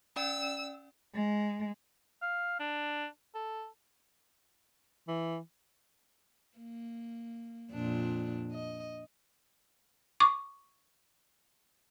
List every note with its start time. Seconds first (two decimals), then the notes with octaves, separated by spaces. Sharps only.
0.16 C#4 D5 G5 E6
1.15 G#3
2.22 F5
2.60 D4
3.35 A4
5.08 E3
6.58 A#3
7.72 F2 A#2 D4
8.52 D#5
10.20 C#6 D6